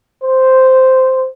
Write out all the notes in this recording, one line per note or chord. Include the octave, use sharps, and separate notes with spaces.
C5